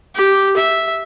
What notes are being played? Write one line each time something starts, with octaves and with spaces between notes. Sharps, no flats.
G4
E5